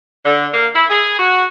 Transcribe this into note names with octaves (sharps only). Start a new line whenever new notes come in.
D3
A#3
E4
G#4
F#4